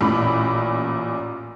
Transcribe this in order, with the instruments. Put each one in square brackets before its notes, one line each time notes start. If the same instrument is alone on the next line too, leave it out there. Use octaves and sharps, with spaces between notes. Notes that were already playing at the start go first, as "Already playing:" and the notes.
[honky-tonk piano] A1 A#2 B5